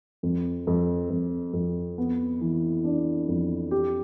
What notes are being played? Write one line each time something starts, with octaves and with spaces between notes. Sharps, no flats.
F2
F2
F2
F2
B3
E3
D4
F2
G4